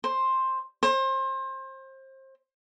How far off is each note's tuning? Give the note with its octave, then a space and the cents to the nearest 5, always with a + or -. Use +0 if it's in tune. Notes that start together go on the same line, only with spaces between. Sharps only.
C5 +10
C5 +30